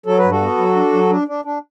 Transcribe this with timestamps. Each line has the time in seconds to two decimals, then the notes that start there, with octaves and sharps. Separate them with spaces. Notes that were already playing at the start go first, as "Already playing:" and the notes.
0.06 F#3 A4
0.18 B4
0.24 G2
0.30 F#4 A4
0.41 B3
0.58 F#3
0.75 D4
0.93 F#3
1.10 D4
1.28 D4
1.45 D4